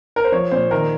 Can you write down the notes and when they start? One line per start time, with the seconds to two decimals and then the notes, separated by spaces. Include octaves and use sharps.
0.16 A#4
0.24 C5
0.32 F3 C#5
0.51 A#2 C5
0.71 D#3 A#4